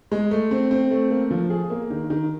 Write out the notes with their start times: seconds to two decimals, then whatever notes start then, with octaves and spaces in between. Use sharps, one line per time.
0.12 G#3
0.31 A3
0.51 C4
0.71 C4
0.91 A3
1.11 A#3
1.31 F3
1.50 G#4
1.70 A#3
1.90 D#3
2.10 D#3